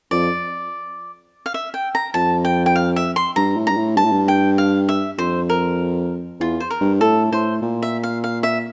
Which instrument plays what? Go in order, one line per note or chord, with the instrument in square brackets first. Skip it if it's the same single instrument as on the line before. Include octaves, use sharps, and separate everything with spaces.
[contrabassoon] F2 [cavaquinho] D5
[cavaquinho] F5
E5
G5
A#5
[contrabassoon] F2 [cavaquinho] A5
[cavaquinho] G5
G5
F5
E5
C6
[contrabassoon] G2 [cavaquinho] A#5
[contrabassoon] A2
[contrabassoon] G2 [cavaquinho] A#5
[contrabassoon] A2
[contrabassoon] G2 [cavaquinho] A5
[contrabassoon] A2
G2
[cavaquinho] G5
F5
E5
[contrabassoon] F2 [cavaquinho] C5
[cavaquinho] A#4
[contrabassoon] E2 [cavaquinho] F4
[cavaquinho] C5
A#4
[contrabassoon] G2
[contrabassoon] A2 [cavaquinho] A4
[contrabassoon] A2 [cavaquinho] C5
[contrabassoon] A#2
[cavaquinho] E5
F5
F5
E5